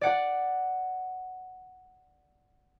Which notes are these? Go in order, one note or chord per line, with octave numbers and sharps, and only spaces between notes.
D5 F#5